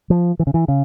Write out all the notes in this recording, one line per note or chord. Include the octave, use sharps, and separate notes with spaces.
F3
E3
C#3
E3
C#3